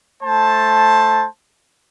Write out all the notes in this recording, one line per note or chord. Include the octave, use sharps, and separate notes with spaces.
A3 C5 A5